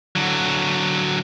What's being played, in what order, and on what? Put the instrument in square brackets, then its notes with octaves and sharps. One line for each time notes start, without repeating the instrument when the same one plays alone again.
[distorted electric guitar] D3 F#3